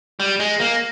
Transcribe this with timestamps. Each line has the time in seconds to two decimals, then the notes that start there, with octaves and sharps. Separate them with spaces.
0.20 G3
0.40 G#3
0.60 A#3